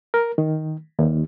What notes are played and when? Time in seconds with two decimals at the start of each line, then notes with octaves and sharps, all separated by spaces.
0.14 A#4
0.38 D#3
0.99 D#2